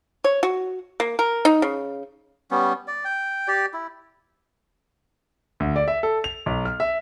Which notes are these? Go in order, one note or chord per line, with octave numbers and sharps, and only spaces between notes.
C#5
F#4
A#3
A#4
D#4
C#3
G3 B3 C#4
D5
G5
G4 D5
E4
D2
D5
E5
A4
F7
B1
F6
E5